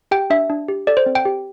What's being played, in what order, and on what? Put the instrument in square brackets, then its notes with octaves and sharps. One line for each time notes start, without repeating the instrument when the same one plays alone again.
[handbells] G4 G5
D4 E5
D4
G4
A4 D5
C5
C4
G5
G4